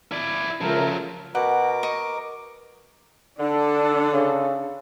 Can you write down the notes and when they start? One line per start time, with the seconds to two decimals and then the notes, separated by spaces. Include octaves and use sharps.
0.12 E4 D5
0.61 C#2 F3 F#3 A3 A#4
1.35 B2 A#4 F#5 D6
1.83 D#5 C#6
3.39 D3 D4 A4
4.13 C#3